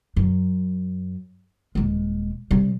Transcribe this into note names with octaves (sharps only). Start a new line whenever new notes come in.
F#2
D#1 G#3
C3 G3